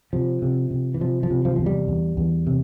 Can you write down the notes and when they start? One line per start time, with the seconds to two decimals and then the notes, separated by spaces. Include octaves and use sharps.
0.13 C3 F3
0.42 C3
0.71 C3
0.94 E3
1.01 C3 F3
1.23 F3
1.30 C3
1.45 F3
1.56 E2 F3
1.66 G3
1.88 E2
2.17 E2
2.47 C3